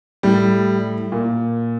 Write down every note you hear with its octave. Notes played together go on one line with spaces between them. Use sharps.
A2 G3
A#2